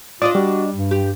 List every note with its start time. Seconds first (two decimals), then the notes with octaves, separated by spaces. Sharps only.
0.22 D4 F4 D5 D#5 D6 D#6
0.35 G3 F#4
0.73 G2
0.91 G4